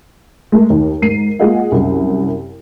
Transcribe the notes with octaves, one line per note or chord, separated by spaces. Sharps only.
G#3 A3 A#4
D#2 D#4
G#2 A#4 C7 D#7
G#3 A#3 F4 G#4 D#5 F#5
C2 F#2